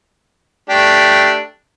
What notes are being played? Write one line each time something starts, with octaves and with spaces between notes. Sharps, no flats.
A3 D4 G4